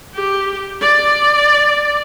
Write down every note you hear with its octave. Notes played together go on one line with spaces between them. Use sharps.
G4
D5